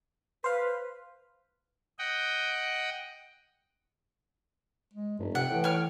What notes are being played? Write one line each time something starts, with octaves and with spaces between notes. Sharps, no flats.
B4 C5 F5
D#5 F#5 G5
G#3
F1 G2
C3 F#5 G5
A2 E3
C#5 F6